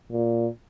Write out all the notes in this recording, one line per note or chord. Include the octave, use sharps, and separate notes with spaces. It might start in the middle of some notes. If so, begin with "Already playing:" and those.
A#2